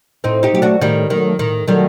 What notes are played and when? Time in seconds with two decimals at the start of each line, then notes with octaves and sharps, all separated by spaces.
0.24 A2 C4 D#4
0.43 D#4 G4
0.53 F#3 A3 G4
0.62 D4 F#4
0.81 A2 D#3 G3
1.10 D#3 F#3 A3
1.39 A2 D#3
1.68 D#3 F#3 G3 A3